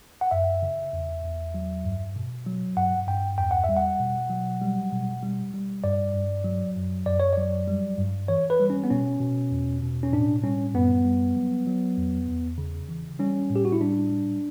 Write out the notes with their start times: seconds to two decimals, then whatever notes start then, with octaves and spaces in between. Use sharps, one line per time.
0.21 F#5
0.31 F#2 E5
0.62 C#3
0.93 E2
1.24 E2
1.54 F#3
1.85 G2
2.16 B2
2.46 F#3
2.77 G2 F#5
3.07 G2 G5
3.38 E2 G5
3.51 F#5
3.64 E5
3.69 G3
3.77 F#5
4.00 B2
4.30 F#3
4.62 G3
4.92 B2
5.23 G3
5.54 G3
5.84 G2 D5
6.14 G2
6.45 F#3
6.76 F#2
7.06 F#2 D5
7.20 C#5
7.33 F#3 D5
7.68 G3
7.98 G2
8.28 E3 C#5
8.50 B4
8.60 G3
8.70 C#4
8.84 B3
8.90 B2 C#4
9.20 B2
9.51 E2
9.82 B2
10.03 C#4
10.12 A2 D4
10.43 G3 C#4
10.74 F#2 B3
11.05 G3
11.36 F#3
11.67 F#3
11.98 E2
12.28 E2
12.58 C#3
12.89 E3
13.19 G3 C#4
13.50 A2
13.56 G4
13.65 F#4
13.72 E4
13.81 G3 D4
14.11 G3